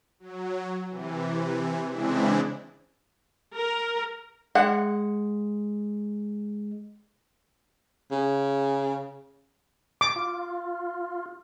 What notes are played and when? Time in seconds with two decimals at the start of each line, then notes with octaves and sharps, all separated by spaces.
0.20 F#3
0.89 C3 E3
1.90 C#3 E3 G#3 C4 D4 E4
3.55 A#4
4.55 G#3 F#5
8.11 C#3
10.01 D6
10.16 F4